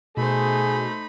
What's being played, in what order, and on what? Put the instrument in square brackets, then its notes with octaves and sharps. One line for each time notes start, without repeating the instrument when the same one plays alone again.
[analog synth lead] B2 [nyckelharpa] A3 C5 [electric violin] D#4 B5 [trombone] G#4